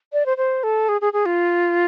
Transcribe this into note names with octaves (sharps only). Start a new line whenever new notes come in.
D5
C5
C5
A4
G#4
G#4
G#4
F4